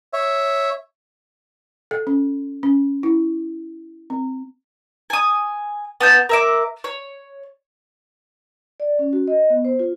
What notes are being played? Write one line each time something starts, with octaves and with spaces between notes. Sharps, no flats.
C#5 E5
A4
C#4
C#4
E4
C4
G#5 D#6
B3 A5 G6
A#4 E5 D6
C#5
D5
C#4
F#4
D#5
B3
C5
F4